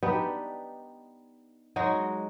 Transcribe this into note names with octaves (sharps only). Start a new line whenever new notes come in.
B3 D4 D#4 G4
F#3 G#3 D#4 F#4